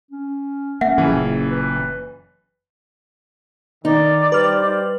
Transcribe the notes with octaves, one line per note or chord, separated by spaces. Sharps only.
C#4
A#3 C#4 E5 F#5
F#1 A#2 C#3 E3 A3
B4
D#3 D#4 D5
G3 G4 B4 C5 F6